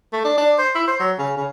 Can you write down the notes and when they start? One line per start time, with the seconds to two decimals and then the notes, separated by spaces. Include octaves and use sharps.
0.13 A3
0.24 D4
0.38 D4
0.59 C5
0.75 E4
0.88 C5
1.00 F#3
1.18 C#3
1.37 C#3